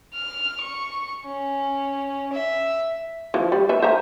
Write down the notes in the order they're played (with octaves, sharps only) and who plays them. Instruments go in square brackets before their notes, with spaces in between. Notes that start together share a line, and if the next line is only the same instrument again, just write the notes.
[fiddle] F6
C#6
C#4
E5
[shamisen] E3 F3
G3
B4 E5
C5 E5 A#5